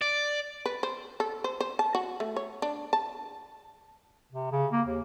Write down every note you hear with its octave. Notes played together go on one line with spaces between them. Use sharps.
D5
B4
C5
A4
C5
C5
A5
F#4
A3
C#5
D4
A5
C3
C#3
A#3
D#2